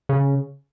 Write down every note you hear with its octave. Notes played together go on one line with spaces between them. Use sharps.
C#3